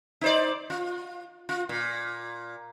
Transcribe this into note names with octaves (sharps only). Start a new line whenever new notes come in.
D#4 C5 D5
F4
F4
A#2